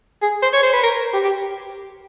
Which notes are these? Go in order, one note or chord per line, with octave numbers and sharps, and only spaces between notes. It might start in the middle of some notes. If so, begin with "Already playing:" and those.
G#4
C5
C#5
C5
B4
A#4
G4
G4